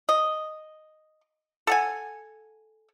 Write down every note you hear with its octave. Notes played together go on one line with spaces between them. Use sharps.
D#5
A4 F#5 G#5